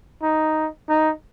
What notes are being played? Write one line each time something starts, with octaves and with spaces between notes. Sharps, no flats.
D#4
D#4